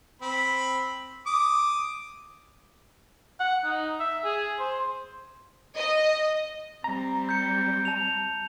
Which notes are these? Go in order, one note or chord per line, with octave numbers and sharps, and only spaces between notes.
C4 B5
D6 D#6
F#5
D#4
E5
G#4
C5
D#5
G3 C4 A#5
G6 C#7
A5 F7